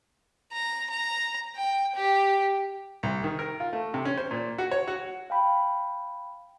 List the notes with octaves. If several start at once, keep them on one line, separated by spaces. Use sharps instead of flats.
A#5
A#5
G5
G4
C2
D#3
A#4
F4
A3
C3
C#4
C5
A#2
F#4
C#5
F#4
F5 G5 B5